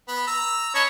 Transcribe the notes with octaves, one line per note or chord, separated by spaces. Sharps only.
B3 B5
A#5 E6
C#5 D#5 A5 B5